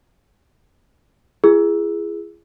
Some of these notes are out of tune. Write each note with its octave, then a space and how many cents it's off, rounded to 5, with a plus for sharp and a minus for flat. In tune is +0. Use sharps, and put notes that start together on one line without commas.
E4 +45 G#4 +0 E6 +0